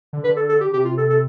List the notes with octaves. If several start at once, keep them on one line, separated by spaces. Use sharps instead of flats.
D3
D3 B4
A4
A4
G4
C3 G4
F4
A4
A4